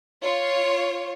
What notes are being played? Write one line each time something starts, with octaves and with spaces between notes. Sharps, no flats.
F4 C#5